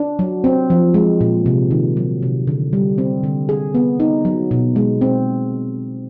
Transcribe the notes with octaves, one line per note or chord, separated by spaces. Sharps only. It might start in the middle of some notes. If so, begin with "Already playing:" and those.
Already playing: D4
F#3
C4
F3
G#3
A#2
C3
D#3
F#3
C3
D3
G3
C4
D3
G#4
B3
D#4
F#3
B2
G#3
C4